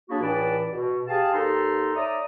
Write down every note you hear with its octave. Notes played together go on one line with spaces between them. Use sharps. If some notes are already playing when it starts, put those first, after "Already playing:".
F#3 A#3 D4 E4 F#4 G#4
C#2 A2 E3 D5 A5 B5
B2
G4 G#4 F5 G#5 A5
D#2 D#4 A4 A#5 C6
C#5 D5 E5 A#5 D#6